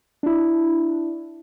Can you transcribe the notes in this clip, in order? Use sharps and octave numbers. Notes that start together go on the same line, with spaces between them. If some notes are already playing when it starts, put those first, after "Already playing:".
D4 E4